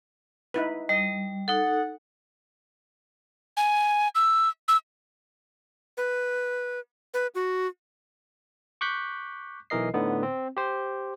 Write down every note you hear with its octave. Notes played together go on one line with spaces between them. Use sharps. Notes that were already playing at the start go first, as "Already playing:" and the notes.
D#4 E4 B4
G3 D#5
D#4 A4 F#5
G#5
E6
E6
B4
B4
F#4
C#6 D6 F#6 G6 B6
B1 E3 A#4 D#5 C7
A2 D3 B3 D#4
C4
G4 C5